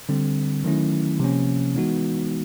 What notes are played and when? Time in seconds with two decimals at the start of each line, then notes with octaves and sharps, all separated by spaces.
0.09 D3 G3 C4
0.64 D#3 F#3 A3 C#4 E4
1.20 C3 F3 A#3 C#4
1.76 E3 G#3 B3 D#4 F#4